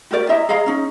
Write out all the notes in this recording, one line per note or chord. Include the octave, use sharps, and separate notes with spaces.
F#4 G4 A#4 D5
E4 D#5 E5 A#5
G#4 D#5 F5 A#5
C#4 D#4